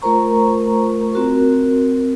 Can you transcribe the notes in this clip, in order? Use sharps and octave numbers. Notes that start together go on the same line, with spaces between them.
A3 F4 A#4 C5 A#5 C#6
C4 F#4 A#4